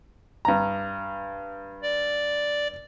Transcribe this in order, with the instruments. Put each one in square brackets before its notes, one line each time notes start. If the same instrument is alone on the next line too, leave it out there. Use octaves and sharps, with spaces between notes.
[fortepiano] G2 A#5
[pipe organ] D5